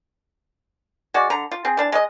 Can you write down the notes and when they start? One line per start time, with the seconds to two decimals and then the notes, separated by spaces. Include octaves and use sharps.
1.14 G#3 F#4 D5
1.30 D3 A#5
1.52 F4
1.65 C4 G#4
1.77 E3 D4 A5
1.92 G#3 D#5